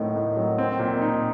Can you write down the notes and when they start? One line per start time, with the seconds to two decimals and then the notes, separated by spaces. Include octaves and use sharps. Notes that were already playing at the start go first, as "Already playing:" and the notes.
Already playing: A2 D#3 F#3 C4
0.16 A2
0.37 F#3
0.58 C4
0.79 A#2
1.01 D#4